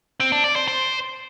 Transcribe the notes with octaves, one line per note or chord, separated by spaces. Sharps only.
C4
D4
D5
C5
C5